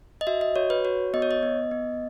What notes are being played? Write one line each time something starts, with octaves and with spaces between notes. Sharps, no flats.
D#5
F#4 E5
D#5
F#4 C#5
B4
F#4 C#5
B3 D#5
C#5
D#5
B3
B3